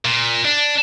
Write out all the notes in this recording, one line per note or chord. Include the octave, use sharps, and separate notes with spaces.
A#2
D4